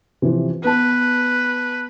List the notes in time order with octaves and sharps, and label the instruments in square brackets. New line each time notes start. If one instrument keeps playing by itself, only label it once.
[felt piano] C3 E3 F3
[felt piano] B3 A5 [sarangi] B4